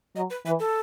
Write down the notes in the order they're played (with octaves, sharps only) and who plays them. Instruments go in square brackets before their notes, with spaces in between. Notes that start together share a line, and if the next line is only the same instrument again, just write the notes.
[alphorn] F#3 [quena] D#5
[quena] B4
[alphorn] E3 [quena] B4
[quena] A4